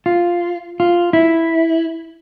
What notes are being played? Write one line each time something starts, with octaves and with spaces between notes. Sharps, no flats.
F4
F4
E4